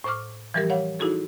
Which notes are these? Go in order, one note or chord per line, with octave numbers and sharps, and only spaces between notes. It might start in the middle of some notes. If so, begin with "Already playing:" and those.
A2 C5 C#6 D6 F6
E3 F3 G3 G4 A#4 G#6
C#5 F5 F#5
D#4 E4 F#4 G#4 A4